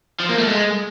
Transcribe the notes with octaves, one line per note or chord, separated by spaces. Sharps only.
F3
A#3
A3
G#3